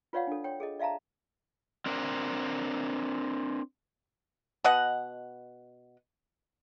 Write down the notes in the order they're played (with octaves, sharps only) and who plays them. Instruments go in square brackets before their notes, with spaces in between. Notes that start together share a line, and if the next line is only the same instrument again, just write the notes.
[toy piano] F4 B4 C#5 D5 F5 F#5
D4 A4
C#5 G5
G#4 A4 D#5
D5 E5 F5 A5 A#5
[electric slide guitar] C4 D4 A#4
[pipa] B2 D#5 F#5